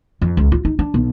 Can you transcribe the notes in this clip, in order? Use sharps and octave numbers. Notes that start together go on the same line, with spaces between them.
F2
C#2
F4
D#4
D4
B1